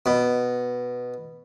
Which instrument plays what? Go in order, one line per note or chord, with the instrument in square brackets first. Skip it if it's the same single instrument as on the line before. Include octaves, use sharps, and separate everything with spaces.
[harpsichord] B2